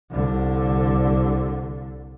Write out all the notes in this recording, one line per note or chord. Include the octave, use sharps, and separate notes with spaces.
C2 D3